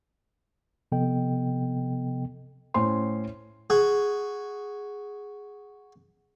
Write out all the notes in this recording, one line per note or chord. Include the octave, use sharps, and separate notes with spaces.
C3 F3 B3 A4 D#5 G5
A2 C#4 C5 C6
F#4 G#4